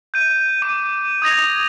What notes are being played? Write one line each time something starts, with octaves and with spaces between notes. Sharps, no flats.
G6 D#7
D6 D#7
D#6 G#6 A#6 F7